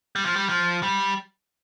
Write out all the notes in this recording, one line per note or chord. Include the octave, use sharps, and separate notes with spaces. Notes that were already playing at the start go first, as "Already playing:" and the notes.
G3
F3
G3
F3
G3